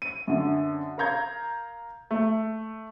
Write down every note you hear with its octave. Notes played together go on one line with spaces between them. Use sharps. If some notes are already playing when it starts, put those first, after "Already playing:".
D#7
F#2 D3
A#4 F5 A#5 G6 G#6
A3